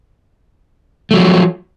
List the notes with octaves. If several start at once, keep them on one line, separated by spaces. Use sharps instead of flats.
F3 F#3 A3